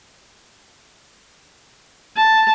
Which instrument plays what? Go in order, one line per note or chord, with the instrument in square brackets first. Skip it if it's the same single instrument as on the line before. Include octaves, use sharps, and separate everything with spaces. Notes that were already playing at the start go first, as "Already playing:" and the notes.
[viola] A5